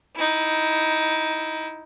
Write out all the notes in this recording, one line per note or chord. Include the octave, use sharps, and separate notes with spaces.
D#4 E4